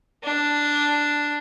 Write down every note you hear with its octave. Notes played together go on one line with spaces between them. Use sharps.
D4